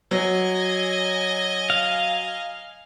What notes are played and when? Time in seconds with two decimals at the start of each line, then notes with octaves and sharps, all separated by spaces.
0.11 F#3 D#5 G#5
1.70 F5